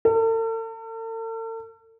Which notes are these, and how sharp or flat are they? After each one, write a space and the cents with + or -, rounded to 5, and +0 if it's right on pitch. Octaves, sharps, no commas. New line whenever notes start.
A4 +45